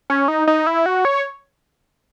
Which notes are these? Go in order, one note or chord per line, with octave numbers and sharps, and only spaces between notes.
C#4
D#4
D#4
E4
F#4
C#5